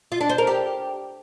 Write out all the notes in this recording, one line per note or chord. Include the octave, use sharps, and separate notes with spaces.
F4
D4
C5
A#4
G4